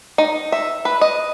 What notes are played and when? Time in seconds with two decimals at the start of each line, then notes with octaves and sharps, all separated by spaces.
0.18 D#4
0.52 E5
0.85 B4
1.01 D#5